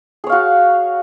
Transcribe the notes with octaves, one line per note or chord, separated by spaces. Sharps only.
F#4 G#4 C#5 F5